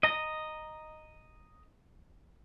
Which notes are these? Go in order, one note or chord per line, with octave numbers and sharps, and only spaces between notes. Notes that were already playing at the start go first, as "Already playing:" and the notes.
D#5 A#5